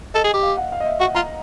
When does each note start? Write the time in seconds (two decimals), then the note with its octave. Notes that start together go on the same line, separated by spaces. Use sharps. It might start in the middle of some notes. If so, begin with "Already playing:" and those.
0.14 A4 D#5
0.24 G#4
0.34 G4
0.43 F5
0.57 F#5
0.72 F5
0.80 D#5
0.86 E5
1.00 F#4 F#5
1.15 F4 A#5